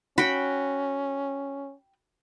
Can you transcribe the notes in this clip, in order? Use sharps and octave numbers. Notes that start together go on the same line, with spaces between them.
C#4 F#4 G5 B5